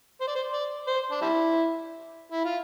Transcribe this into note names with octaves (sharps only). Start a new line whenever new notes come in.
C5
D5
C5
D5
C5
D4
G3 C4 E4
E4
F4